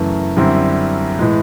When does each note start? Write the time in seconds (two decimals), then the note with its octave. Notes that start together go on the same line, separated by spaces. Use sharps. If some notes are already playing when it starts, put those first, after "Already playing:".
Already playing: F#2 C#3 E3 A3
0.37 F#2 D3 G3 C4 E4
1.19 A2 E3 G#3